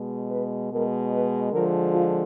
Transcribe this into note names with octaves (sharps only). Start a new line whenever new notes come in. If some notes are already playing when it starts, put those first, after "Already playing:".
Already playing: B2 G#3
B4
B2 G#3 A#4
B4
D3 F3 G#3 A#4
F4